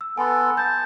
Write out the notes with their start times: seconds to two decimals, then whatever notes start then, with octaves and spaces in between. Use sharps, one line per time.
0.01 E6
0.18 B3 A4 G#5 B5 C6
0.57 A5 G6